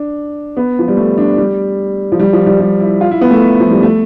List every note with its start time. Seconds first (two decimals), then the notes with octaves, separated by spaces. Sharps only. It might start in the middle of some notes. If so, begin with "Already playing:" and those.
Already playing: D4
0.57 B3
0.79 F3
0.88 G3
0.97 A3
1.18 D4
1.38 G3
2.12 F3
2.20 G3
2.33 F3
2.46 G3
2.60 G3
2.80 E4
3.01 F4
3.11 E4
3.21 B3
3.31 A3
3.60 F3
3.71 G3
3.83 A3